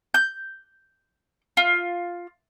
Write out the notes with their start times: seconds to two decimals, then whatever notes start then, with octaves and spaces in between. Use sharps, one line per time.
0.14 G6
1.57 F4